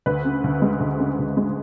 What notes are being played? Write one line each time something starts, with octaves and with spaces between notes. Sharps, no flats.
D2 B4
C#3
D2
G#3
D2
C#3
D2
G#3